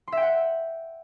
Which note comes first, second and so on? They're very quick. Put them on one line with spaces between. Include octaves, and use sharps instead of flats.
C6 E5 G5 F#5